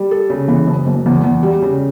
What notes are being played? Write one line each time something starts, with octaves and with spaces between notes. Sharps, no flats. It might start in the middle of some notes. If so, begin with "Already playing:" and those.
Already playing: G3
A4
C#3
E3
F#1
F#1
E2
E2
G3
C#3